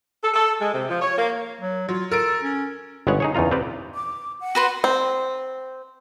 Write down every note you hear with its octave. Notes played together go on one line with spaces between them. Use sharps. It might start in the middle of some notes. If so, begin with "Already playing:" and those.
A4
A4
G#3
C3
F3
C#5
A#3
F#3
F#3 F4
A4 A#4 D7
C#4
G1 G#3 B3 C#4 C#5 F#5
D#4 G#4 C#5
E2 C#3 D#4 F4 A#5
C4 G4 B4 D5
D6
F#5
F#4 B4 C6
C4